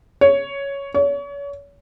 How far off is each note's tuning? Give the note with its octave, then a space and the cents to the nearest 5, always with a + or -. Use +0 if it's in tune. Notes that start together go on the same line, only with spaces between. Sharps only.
C#5 +5
C#5 +35